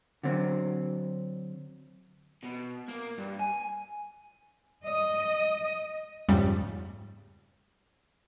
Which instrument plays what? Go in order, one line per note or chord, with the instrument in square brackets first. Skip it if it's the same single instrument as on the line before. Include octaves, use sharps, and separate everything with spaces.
[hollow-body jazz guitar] D3 F#3 C4
[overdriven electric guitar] B2
A#3
G2
G#5
[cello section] D#5
[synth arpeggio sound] F2 G#2 C#3 G3